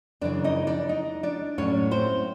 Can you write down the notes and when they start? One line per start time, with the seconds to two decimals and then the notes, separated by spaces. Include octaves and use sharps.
0.21 F#2 C#3 E3 D4 D5
0.44 D#4 D#5
0.67 D4 D5
0.89 D#4 D#5
1.23 D4 D5
1.58 A2 F#3 C#4 C#5
1.91 C4 C5